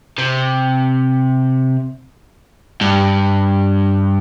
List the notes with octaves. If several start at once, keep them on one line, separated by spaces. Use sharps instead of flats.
C3
G2